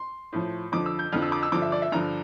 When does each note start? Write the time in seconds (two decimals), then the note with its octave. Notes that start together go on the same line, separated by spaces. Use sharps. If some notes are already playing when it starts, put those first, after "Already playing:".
Already playing: C6
0.33 A2 F3
0.72 F2 D3 F3 D6
0.86 E6
0.99 G6
1.12 F2 D3 F3 F6
1.22 E6
1.32 D6
1.43 E6
1.52 G2 D3 F3 D6
1.62 E5
1.72 D5
1.82 E5
1.92 G2 D3 F3 A#5